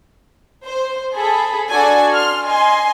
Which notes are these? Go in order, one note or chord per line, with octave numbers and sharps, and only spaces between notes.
C5
G#4 A4 B5
D4 F#4 A4 D5 G#5
C6 F6
D#5 G#5 C6